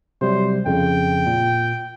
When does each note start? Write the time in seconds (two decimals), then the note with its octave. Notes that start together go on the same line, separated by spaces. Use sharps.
0.21 C3 F#3 G3 C5
0.66 F2 C#3 G5
1.26 A#2